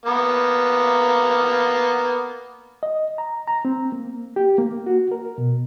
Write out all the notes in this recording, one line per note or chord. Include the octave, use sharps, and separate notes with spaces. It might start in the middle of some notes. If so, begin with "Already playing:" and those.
A#3 B3
D#5
A#5
A#5
C4
A#3
G4
A#3
F#4
A#4
B2